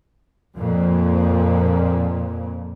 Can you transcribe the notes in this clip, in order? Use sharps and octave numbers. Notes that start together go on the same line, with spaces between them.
F2 A#2